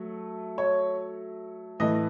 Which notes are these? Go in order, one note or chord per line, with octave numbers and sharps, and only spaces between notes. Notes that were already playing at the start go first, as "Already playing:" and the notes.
Already playing: F#3 A3
C#5
A2 E3 A3 D#5